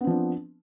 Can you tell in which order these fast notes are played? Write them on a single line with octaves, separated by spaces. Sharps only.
B3 C4 F3 D4